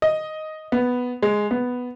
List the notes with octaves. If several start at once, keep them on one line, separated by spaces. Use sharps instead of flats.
D#5
B3
G#3
B3